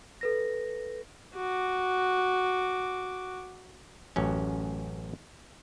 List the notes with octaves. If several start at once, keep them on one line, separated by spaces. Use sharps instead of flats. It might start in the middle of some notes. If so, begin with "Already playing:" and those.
A4 B4 A#6
F#4 D6
A1 F#2 C#4